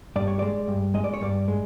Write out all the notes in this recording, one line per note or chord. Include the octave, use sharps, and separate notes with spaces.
G2 D5
C#5
G#3 D5
G2
G#3 D#5
D5
C#5
G2 D5
G#3